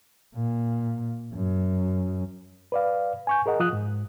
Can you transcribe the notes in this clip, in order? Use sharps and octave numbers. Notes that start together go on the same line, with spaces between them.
A#2
F#2
B4 D5 F5
G#5 C#6 G6
G#4 A#4 D#5 F#5
F3 F4 D#6 F#6
G#2